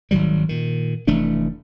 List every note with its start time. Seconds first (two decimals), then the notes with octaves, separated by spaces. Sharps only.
0.11 G#1 D#3 F#3 G3
0.49 A#2 D#3
1.07 F1 E3 A3 D4